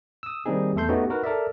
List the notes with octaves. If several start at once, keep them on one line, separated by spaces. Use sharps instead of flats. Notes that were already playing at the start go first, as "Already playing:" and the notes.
D#6 E6
D#3 G3 A#3 C4 D#4 G#4
E2 A3 A4 C6 G6
A3 B3 C#4 D#4 F#4 G4
D#4 F#4 A#4 B4
A4 A#4 D5 E5